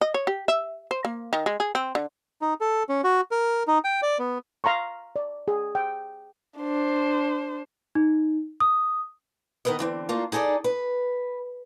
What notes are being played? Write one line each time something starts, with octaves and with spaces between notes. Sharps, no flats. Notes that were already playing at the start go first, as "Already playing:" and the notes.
D#5
C#5
G4
E5
C5
A#3
D#3
G#3
G#4
C4
D3
D#4
A4
C#4
F#4
A#4
D#4
G5
D5
B3
F5 A#5 C6 C#6
D5
G#4
G5
D4 C5
D#4
D#6
D#3 B3 A#4 B4 D#5
D3 E3 C4
A3 A#3 D4 F4
D#4 G#4 A4 C5 D5
B4